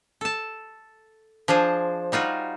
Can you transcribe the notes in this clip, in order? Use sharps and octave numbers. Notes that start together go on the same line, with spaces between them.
A4 A5
F3 D4 G#4 C5
G3 D#4 F4 F#4